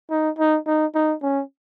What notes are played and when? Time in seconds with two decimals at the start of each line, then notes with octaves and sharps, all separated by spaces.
0.10 D#4
0.39 D#4
0.67 D#4
0.95 D#4
1.23 C#4